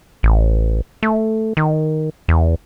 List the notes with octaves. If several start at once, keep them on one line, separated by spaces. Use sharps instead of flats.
A1
A3
D#3
E2